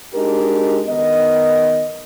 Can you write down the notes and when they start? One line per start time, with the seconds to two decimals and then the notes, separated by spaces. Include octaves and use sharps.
0.14 G#3 D4 D#4 F#4 G4 A#4
0.88 D#3 B3 A#4 D#5